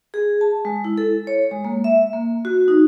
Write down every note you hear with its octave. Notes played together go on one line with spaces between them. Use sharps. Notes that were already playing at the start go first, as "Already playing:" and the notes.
G#4
A5
G#3
E4
A4
C#5
G#3
A#3
E5
A#3
F#4
D#4